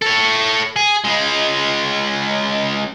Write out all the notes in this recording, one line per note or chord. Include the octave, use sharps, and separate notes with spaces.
A4 C#5
G#4
C#2 G#3